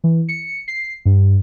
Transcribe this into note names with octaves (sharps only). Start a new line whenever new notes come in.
E3
C#7
C7
G2